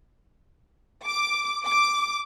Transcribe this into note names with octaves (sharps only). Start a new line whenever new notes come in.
D6
D6